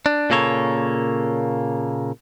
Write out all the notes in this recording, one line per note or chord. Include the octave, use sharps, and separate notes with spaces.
D4
A#2 C#3 A#3 A4 C#5